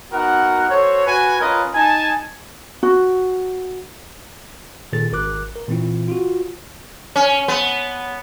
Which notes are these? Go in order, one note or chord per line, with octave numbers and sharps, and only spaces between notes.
B3 D#4 F#4 A#4 F#5
F#4 A4 C5 C#5
F#4 B4 G#5
C#4 F4 A#4 B4 C#5 D#5
D#4 G#5 A5
F#4
A#2 D#3 G#4 A4 A6
G#1 A#4 D6 F#6
A#4
A#2 E3 C4 E4 F4
F4 F#4
C#4
B3